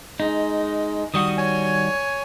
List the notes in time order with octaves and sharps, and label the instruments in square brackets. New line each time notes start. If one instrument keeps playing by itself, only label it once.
[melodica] G#3 [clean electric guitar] D#4
[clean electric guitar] D#3 G3 F#4 [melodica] D#6
[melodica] C#5 G#5